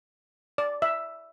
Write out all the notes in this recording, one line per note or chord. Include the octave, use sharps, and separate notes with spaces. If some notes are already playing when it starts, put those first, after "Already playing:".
D5
E5